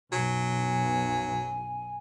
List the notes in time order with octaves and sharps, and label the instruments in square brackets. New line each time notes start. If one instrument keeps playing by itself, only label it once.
[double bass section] B1 F#2 [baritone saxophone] F#3 [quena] G#5